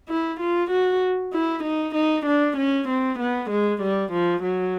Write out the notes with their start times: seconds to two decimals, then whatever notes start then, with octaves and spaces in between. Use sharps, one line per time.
0.09 E4
0.40 F4
0.71 F#4
1.33 E4
1.64 D#4
1.95 D#4
2.26 D4
2.57 C#4
2.88 C4
3.19 B3
3.50 G#3
3.82 G3
4.12 F3
4.43 F#3